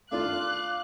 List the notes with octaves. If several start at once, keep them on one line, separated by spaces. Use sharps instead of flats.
A3 D4 F4 F5 D6 F#6